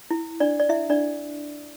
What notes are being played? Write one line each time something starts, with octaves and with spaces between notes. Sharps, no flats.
E4
D4 D5
D5
E4 E5
D4 D5